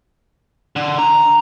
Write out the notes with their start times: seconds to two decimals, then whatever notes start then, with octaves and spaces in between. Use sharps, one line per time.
0.76 D3
0.99 A#5